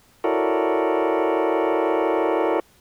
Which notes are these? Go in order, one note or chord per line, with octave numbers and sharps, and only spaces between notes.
E4 F#4 A4 A#4 C#5 D5